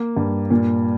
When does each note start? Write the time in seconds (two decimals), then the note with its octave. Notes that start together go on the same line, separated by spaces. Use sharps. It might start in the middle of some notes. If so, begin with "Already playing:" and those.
Already playing: A#3
0.17 G2
0.50 A#2